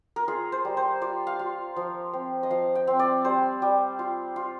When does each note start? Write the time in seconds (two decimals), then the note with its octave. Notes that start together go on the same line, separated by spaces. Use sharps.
0.16 A#4
0.28 F4 G#4
0.52 C5
0.65 G3
0.77 C5
1.01 F4 D5
1.27 F5
1.39 F4
1.76 F3
2.13 C4
2.43 D#5
2.50 F3 F5
2.75 G5
2.87 C4
2.99 D5
3.25 G3 C5
3.62 G3
3.99 F4
4.36 F4